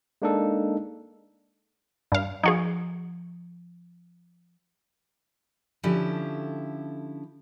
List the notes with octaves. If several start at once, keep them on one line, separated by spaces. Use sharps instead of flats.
G#3 A#3 D4 D#4 A4
G2 F5
F3 D#4 F#4 G#4
D3 F3 C#4 E4 G4 A4